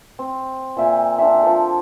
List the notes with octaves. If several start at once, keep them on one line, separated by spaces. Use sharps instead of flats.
C4
A#2 E5 G5 G#5
D4 C5 D5 E5
F3 A4